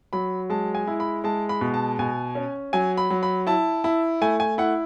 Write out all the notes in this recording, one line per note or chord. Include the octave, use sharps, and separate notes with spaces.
F#3 B5
G#3 A5
G#5
E4
B5
G#3 A5
B5
B2
A5
B2 G#5
C#4
F#3 G#5
B5
F#3
B5
E4 A5
E4
A3 G#5
G#5
E4 F#5